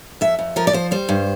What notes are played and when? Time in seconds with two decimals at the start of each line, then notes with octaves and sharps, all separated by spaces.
0.21 F2 E5
0.39 F2
0.56 F3 A#4
0.67 D5
0.73 F3 C5
0.91 G3 C5
1.09 G2